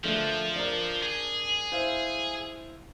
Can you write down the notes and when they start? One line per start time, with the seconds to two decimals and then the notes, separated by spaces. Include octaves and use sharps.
0.04 D3 F3 A3 A#3
0.56 D4 A#4
1.03 G#4
1.72 E4 C5 F5